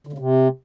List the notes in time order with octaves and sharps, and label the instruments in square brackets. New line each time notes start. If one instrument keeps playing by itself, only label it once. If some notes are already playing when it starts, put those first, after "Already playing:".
[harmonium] D3
C#3
C3